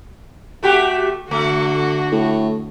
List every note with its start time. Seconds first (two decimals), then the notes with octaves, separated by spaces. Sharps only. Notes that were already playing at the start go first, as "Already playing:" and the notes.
0.63 A3 F#4 G4
1.31 D3 A3 F#4
2.12 A2